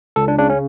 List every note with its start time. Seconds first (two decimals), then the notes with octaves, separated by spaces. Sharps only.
0.16 C#2 A4
0.28 D4
0.39 C#3 D4
0.50 C#4